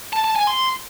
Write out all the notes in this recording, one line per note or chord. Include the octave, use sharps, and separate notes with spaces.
A5
A5
G#5
C6